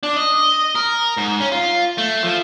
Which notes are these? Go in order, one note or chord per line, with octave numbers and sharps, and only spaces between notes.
D4
D#5
A#4
G#2
C#4
F4
A3
F3